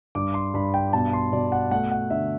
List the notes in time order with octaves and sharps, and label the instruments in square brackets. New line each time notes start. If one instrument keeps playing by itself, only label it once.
[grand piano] G2 D6
C6
G2 B5
G5
B2 A5
C6
B2 D5
F#5
A3 F#5
F#5
D3 E5